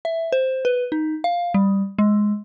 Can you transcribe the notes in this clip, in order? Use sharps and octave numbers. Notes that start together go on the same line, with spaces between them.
E5
C5
B4
D#4
F5
G3
G#3